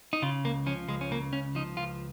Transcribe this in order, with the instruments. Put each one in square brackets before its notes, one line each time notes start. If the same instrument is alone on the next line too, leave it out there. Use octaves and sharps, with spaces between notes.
[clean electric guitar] D#4
C#3 F4
C#2 A#3
F3 C#4
C#2 G#3
C#4
C#3 A#3
C#2 C#4
F3 D#4
C#2 F4